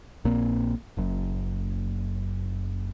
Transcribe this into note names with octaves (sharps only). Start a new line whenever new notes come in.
A#1 A#2 A#3 C4
F#1 F#2